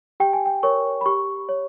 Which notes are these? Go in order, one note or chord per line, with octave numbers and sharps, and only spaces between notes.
G4 G5
G#5
G5
A#4 C#5 C#6
B5
G4 C#6
C#5